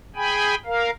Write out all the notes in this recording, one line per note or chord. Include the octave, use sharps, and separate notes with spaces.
G#4 G5 G#5 B5
A#4 F5